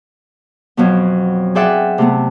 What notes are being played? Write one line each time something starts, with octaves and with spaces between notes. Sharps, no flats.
F2 B2 F#3 B3
G#4 C5 D5 E5 F#5 G5
C3 A3 B3